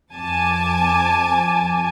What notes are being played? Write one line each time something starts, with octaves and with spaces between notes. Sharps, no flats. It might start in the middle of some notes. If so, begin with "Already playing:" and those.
F2 G#5 A5 D6